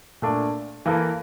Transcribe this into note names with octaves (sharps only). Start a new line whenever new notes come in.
A#2 A3 D4
E3 A#3 E4 A4